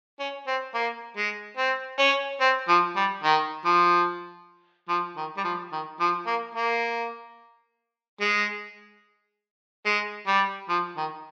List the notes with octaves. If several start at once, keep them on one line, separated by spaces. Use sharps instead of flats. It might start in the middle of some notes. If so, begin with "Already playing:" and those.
C#4
C4
A#3
G#3
C4
C#4
C4
F3
G3
D#3
F3
F3
D#3
G3
F3
D#3
F3
A#3
A#3
G#3
G#3
G3
F3
D#3